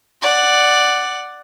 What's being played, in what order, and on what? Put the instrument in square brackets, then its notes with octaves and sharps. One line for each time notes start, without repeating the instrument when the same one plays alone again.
[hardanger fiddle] D5 F#5